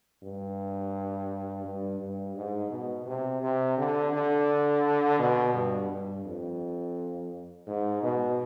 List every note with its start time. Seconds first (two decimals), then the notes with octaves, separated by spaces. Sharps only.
0.23 G2
1.65 G2
2.00 G2
2.35 G#2
2.71 B2
3.06 C3
3.42 C3
3.78 D3
4.13 D3
5.19 B2
5.54 G2
5.90 G2
6.26 F2
7.67 G#2
8.03 B2